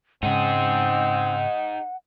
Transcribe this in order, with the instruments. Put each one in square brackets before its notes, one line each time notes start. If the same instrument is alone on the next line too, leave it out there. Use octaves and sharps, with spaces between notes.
[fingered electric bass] G#2 C#3 [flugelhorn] C4 [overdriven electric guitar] D#4 G#4 [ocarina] F#5